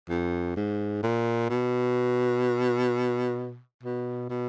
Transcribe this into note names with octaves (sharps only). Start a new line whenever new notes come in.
F2
G#2
A#2
B2
B2
B2